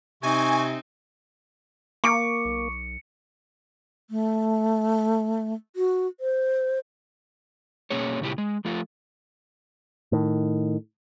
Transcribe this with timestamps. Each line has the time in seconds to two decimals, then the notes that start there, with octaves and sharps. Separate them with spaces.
0.23 C3 C4 D#4 G#5 C#6
2.04 A#3 C#6 D6 C#7 D7
2.45 B1
4.10 A3
5.76 F#4
6.20 C5
7.90 B2 A#3 C#4 G#4 C#5
8.20 A#2 C#3 E4 G4
8.38 G#3
8.65 F3 A3 F4
10.12 A2 D#3